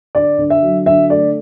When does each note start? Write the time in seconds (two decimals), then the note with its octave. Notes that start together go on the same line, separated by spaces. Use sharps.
0.15 D3 D5
0.39 D3
0.50 E5
0.63 F#3
0.86 D3 E5
1.10 A3 D5